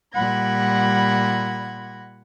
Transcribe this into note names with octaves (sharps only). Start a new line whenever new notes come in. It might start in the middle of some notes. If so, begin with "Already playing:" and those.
A#2 G3 F#5 B5 G#6 A#6